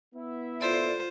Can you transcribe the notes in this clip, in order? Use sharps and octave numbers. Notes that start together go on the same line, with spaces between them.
B3 E4 E5
F4 A4 C5 D5